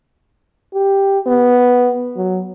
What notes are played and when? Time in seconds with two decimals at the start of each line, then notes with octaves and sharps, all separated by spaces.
0.74 G4
1.26 B3
2.16 F#3